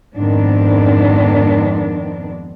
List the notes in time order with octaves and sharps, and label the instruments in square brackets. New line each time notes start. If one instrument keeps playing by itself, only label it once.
[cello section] F2 G#2 D#3 B3 C4 D4